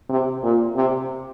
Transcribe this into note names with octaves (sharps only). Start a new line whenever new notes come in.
C3
A#2
C3